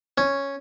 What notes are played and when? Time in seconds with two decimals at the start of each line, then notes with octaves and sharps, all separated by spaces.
0.18 C#4